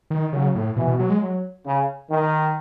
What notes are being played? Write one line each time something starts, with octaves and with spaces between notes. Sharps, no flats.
D#3
C#3 F#3
A2
B2 E3
B2
F#3
G#3
F#3
C#3
D#3